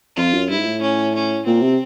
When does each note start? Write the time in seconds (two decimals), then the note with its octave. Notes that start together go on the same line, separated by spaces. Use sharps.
0.17 F2 F4
0.34 F#2
0.49 G2 E4
0.58 G#2
0.66 A2
0.81 C#4
1.15 C#4
1.46 A#2 C4
1.62 C3